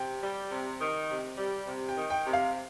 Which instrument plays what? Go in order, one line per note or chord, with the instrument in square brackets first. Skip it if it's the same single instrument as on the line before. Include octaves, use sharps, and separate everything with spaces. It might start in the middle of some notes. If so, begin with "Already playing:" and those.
Already playing: [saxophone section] C3 [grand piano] G5
[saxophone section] G3
C3
D#3
C3
G3
C3
[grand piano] G5
[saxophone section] D#3
[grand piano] G5
[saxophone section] C3
[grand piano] F5